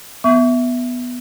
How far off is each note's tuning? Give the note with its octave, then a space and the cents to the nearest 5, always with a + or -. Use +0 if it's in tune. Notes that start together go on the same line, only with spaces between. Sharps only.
B3 +0 E5 +0 C#6 +40